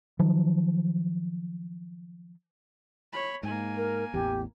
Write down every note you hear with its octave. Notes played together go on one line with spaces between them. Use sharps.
D#3 F3 F#3
C#5 B5
G#2 A#3 G#5
A#4
A1 E2 G4